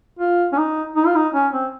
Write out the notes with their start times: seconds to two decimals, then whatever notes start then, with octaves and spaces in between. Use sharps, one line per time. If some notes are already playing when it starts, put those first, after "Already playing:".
0.19 F4
0.53 C#4
0.58 D#4
0.96 D#4
1.06 F4
1.15 D#4
1.34 C#4
1.53 C4